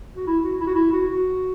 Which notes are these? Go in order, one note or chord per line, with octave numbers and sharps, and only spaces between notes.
F#4
E4
F#4
E4
F#4
E4
F#4
F#4